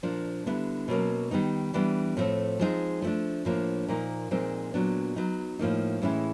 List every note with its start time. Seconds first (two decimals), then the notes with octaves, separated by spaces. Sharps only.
0.03 A#2 F3 A#3 D4
0.46 D3 G3 B3 E4
0.88 B2 F#3 A#3 C#4
1.31 D#3 G3 B3 D#4
1.74 E3 G3 B3 D4
2.17 A2 F3 A3 C4
2.60 F3 G#3 C4 D#4
3.02 F3 A3 D4
3.45 A2 F3 A#3 D4
3.88 A#2 F3 A#3 D#4
4.31 A#2 F3 G#3 C4 D#4
4.74 A#2 F#3 B3 D4
5.16 F#3 B3 D#4
5.59 A2 F3 A#3 D#4
6.02 A2 E3 G#3 C#4 E4